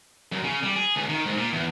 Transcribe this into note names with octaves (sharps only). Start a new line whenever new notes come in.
F#2
C#3
G3
G#4
C#2
D#3
G#2
A#2
E2